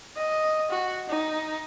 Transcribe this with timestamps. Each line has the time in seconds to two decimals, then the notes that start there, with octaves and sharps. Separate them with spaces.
0.17 D#5
0.70 F#4
1.09 D#4